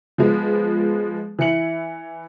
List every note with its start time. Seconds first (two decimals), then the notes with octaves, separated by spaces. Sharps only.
0.18 F3 G#3 B3
1.39 E3 E4 C#7 F#7